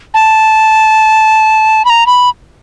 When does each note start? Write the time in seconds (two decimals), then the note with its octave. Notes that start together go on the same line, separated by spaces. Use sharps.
0.14 A5
1.85 B5
1.90 A#5
2.07 B5